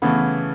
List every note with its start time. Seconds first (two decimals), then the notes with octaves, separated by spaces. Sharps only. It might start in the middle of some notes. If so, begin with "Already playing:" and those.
0.02 C#3 E3 A3 B3